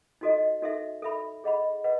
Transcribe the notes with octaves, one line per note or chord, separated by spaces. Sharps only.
D#4 F#4 A4 D#5
D#4 F#4 A4 E5
A4 E5 B5
G#4 D#5 F#5 B5
B4 D#5 F#5